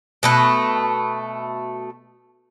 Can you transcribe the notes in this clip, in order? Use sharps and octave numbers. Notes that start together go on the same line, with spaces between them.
B2 A3 B4